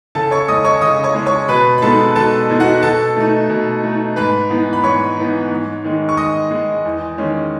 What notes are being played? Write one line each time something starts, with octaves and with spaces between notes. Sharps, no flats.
C#3 A4 A5
C#5 C#6
G#3 C#4 D#5 D#6
C#5 C#6
C#3 D#5 D#6
C#5 C#6
G#3 C#4
C#5 C#6
B2 B4 B5
B5
G#3 B3 D#4 A4 A5
B2 A4 A5
G#3 B3 D#4
F#4 F#5
B2 A4 A5
A3 D#4
B2
A3 D#4
G#2 B4 B5
E3 B3 D#4
B5
G#2 C#5 C#6
E3 B3 D#4
G#2
D#3 G#3
C#6
G#2 D#5 D#6
D#3 G#3
E2
D#3 G#3 C#4